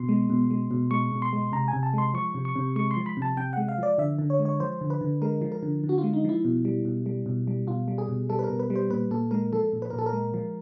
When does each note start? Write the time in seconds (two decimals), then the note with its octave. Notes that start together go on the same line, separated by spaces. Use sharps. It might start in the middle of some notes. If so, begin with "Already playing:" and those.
Already playing: B2 C6
0.09 G#3
0.30 B2
0.51 G#3
0.71 B2
0.91 G#3 C#6
1.12 B2
1.22 C6
1.33 G#3
1.52 C3 A#5
1.68 G#5
1.73 C3
1.83 A5
1.93 G#3 C6
2.14 F3 C#6
2.35 C3
2.45 C#6
2.56 C3
2.76 G#3 C#6
2.91 C6
2.97 F3
3.06 B5
3.17 C3 A5
3.37 C3 G5
3.53 G#3 F#5
3.68 F5
3.78 F3 D5
3.98 D3 E5
4.19 D3
4.30 C#5
4.39 G#3
4.45 C#5
4.60 F3 C5
4.81 D3
4.90 B4
5.01 D3
5.22 G#3 A#4
5.41 F3
5.52 A#4
5.63 D3
5.84 D3
5.89 F#4
5.98 F4
6.03 G#3
6.13 D#4
6.24 F3 E4
6.45 B2
6.65 G3
6.85 B2
7.06 G3
7.26 B2
7.47 G3
7.67 B2 F4
7.88 G3
7.98 G#4
8.09 B2
8.29 G3 A4
8.39 B4
8.44 A#4
8.50 B2
8.59 B4
8.70 G3
8.76 C5
8.90 A#2 B4
9.11 A#2 A4
9.31 G#3 A#4
9.53 F3 A4
9.73 A#2
9.82 B4
9.90 A#2 A#4
9.99 A4
10.06 A#4
10.13 G#3
10.34 F3